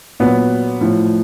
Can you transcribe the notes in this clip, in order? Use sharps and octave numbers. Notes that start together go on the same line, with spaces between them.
A#2 F#3 B3
A2 F3